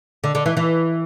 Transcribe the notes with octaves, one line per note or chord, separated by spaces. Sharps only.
D3
D3
E3
E3